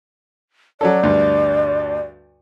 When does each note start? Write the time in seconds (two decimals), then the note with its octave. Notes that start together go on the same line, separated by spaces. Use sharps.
0.81 F#3 C#4 A4 D5
1.03 D2 G2